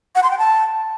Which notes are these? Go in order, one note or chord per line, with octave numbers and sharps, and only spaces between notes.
F#5
C6
G5
A5